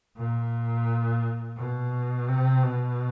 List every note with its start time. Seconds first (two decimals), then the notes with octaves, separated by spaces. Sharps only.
0.17 A#2
1.57 B2
2.29 C3
2.63 B2